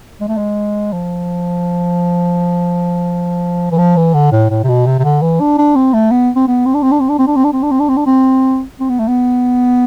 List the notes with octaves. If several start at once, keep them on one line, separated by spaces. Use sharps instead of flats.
G#3
A3
G#3
F3
E3
F3
E3
D3
A2
A2
C3
B2
C3
C3
D3
E3
D4
D4
C4
A3
B3
C4
B3
C4
D4
C4
D4
C4
D4
C4
D4
C4
D4
C4
D4
C4
D4
C4
D4
C4
C4
B3
A3
B3